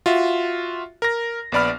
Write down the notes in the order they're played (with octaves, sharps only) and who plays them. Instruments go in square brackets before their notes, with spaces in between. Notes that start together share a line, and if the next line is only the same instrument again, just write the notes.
[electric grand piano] F4 F#4 E5
A#4 A#6
A#1 B3 D5 B5 F6